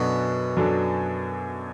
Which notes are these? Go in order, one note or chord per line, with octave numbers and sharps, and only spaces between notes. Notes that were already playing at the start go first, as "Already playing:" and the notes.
Already playing: F#2 B2 F#3 D4 A4
F#2 F#3 D4 A4